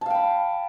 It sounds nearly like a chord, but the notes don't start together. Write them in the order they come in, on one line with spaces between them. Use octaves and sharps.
A5 F5 G5 B5